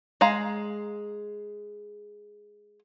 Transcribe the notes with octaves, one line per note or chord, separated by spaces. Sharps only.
G#3 F5 A#5